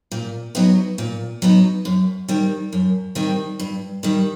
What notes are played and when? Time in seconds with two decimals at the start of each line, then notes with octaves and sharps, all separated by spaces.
0.12 A#2
0.55 F#3 B3 D#4
0.98 A#2
1.42 F#3 B3 D#4
1.85 F#2
2.28 D#3 G3 C4
2.73 F#2
3.15 D#3 G3 C4
3.59 G2
4.03 D#3 G3